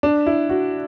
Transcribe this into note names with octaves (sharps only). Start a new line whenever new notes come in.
D4
E4
F#4